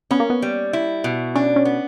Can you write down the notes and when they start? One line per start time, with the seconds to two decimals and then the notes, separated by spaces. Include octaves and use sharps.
0.11 B3 C#4
0.20 A#3
0.30 B3
0.42 G3
0.73 E4
1.04 B2
1.36 C#4 D4
1.56 C#4
1.65 B3